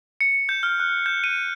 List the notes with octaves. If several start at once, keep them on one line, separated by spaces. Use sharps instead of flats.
C#7
G6
F6
F#6
G6
D#7